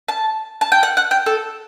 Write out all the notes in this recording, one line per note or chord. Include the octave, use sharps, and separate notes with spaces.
A5
A5
G5
F#5
F#5
G5
A4